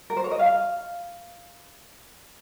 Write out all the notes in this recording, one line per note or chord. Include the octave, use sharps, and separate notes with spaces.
A#4
C5
C#5
D#5
F5